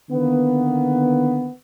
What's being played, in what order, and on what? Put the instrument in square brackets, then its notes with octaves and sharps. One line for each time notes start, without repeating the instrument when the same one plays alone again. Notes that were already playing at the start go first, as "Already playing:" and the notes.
[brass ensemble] D3 D#3 A#3 B3